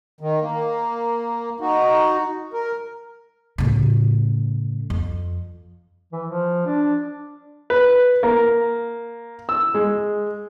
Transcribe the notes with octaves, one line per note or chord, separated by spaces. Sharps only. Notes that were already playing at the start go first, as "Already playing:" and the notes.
D#3
A#3
D#4 F#4
A#4
A2 C#3
F2
E3
F3
D4
B4
A#3
E6
G#3